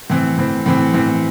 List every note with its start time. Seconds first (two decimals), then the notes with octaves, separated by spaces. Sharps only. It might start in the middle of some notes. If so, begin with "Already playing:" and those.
0.10 A2 E3 C4
0.37 A2 E3 C4
0.66 A2 E3 C4
0.94 A2 E3 C4